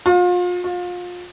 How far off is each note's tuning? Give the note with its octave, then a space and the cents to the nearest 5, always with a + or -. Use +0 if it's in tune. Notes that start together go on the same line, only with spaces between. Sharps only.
F4 +35
F4 +30